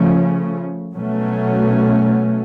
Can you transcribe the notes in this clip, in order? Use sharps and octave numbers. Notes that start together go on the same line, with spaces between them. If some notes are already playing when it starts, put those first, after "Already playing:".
Already playing: C#3 F3 A3 C#4
B2 F#3 A3 C#4